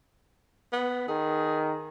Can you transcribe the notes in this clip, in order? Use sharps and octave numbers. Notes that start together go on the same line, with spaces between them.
B3
D#3 G#4